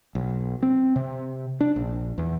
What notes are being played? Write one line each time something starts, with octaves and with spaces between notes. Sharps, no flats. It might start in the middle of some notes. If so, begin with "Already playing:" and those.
B1
C4
C3
D4
A#1
E2